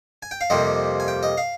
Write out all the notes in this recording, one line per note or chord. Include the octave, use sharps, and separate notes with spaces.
G#5
G5
F5
F2 C3 G3 A#3 D#5
G#5
G5
D#5
F5